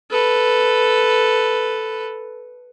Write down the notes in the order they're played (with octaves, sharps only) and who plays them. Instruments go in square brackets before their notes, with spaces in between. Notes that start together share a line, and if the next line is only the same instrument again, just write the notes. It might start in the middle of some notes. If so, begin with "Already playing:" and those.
[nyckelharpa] A4 B4